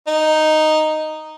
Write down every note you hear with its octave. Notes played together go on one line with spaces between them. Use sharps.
D#4